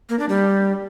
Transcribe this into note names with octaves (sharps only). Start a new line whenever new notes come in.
A#3
D4
G3